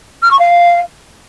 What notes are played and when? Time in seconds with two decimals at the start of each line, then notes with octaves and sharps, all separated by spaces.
0.22 F6
0.30 C#6
0.39 F5